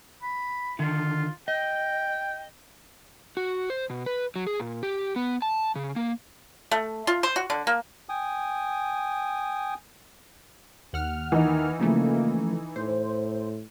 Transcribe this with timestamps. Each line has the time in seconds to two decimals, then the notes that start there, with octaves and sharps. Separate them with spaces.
0.22 B5
0.79 D3 D#3 F4
1.48 D#5 G5
3.37 F#4
3.70 C5
3.90 B2
4.06 B4
4.36 F#3
4.47 G#4
4.60 A#2
4.83 G4
5.16 B3
5.42 A5
5.76 C#3
5.96 A#3
6.71 A3
7.07 F4
7.23 C5
7.36 F#4
7.50 D3
7.67 A#3
8.09 G5 G#5 D#6
10.93 D#2 F#5 F6
11.32 D#3 E3 D#4
11.79 C#3 F3 A3 A#3
12.76 A2 C5